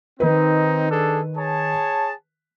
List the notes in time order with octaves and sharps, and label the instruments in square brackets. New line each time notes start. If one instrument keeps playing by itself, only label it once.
[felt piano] D#3 B4 [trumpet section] C4 D#4
[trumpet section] D4 G#4 A4
G#4 C#5 A5